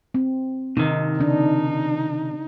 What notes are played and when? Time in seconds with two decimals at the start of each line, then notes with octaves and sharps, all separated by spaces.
0.14 C4
0.77 C3 D#3 D#4
1.19 C#3 D4 D#4